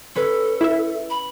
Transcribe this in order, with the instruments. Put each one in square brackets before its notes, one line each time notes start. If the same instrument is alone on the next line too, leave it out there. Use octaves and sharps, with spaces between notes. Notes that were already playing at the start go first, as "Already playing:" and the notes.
[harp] C#4 B4 [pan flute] A4
[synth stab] E4 E5
[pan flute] B5